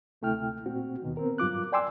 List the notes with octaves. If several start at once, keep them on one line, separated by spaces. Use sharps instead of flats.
D2 C3 A3 E4 G5 F6
A#2 C4 F#4
D#2 B2 D#3
B3 C4 A#4
G2 F#3 F4 D6 F#6
D5 G5 G#5 C6 D6 E6